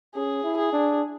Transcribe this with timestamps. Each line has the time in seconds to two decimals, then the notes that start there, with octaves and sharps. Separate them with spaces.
0.15 C#4 G#4
0.43 E4
0.57 G#4
0.73 D4